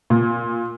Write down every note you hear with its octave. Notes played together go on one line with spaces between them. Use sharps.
A#2